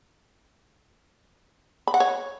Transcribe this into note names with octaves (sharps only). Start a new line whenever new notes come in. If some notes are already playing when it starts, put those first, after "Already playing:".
B5
F#5
C#5